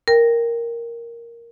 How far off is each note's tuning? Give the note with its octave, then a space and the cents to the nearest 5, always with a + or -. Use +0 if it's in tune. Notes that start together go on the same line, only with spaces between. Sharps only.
A#4 +0 G5 +15